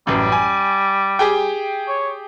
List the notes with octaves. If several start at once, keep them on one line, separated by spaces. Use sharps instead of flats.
A1 F#2 G3
G#5
G4 G#4 G5
C#5